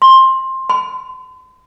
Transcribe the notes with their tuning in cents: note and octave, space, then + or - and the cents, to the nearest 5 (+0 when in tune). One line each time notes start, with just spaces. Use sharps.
C6 +15
C6 -45